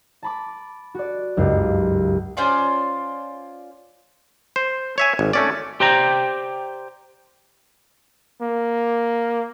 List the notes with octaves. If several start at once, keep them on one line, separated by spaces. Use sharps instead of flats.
A5 B5 D6
F#4 D5
F#1 C#2 G2 C7
C#4 F4 C5 D5
C5
C#5 E5 G#5
G#1
A3 C#4 D5
G4 C5 D5 G5 A#5
A#3